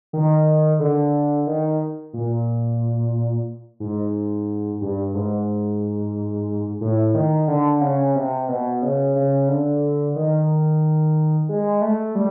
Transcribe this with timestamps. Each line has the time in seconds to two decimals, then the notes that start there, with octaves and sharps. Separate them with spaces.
0.13 D#3
0.80 D3
1.47 D#3
2.14 A#2
3.80 G#2
4.81 G2
5.14 G#2
6.81 A2
7.14 D#3
7.48 D3
7.81 C#3
8.15 C3
8.48 B2
8.82 C#3
9.16 C#3
9.49 D3
10.16 D#3
11.49 G#3
11.82 A3
12.15 G3